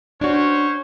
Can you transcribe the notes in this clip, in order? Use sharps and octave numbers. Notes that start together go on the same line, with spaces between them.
C#4 D4 F#4 C5 C#5